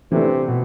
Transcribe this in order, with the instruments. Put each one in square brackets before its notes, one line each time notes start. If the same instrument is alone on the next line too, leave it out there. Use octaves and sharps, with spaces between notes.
[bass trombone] C3 [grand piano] E3 A3 D4
[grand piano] B2